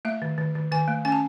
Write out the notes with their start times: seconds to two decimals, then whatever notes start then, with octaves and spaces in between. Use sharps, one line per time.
0.05 A3 E5
0.22 D#3
0.38 D#3
0.55 D#3
0.72 D#3 G#5
0.88 A3
1.05 C#4 G#5
1.12 A5